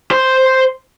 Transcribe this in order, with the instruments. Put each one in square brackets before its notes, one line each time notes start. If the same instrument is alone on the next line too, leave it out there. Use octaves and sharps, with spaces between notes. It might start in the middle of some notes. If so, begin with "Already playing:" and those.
[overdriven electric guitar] C5 C6